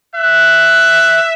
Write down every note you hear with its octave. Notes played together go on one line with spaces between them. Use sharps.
E5 F#6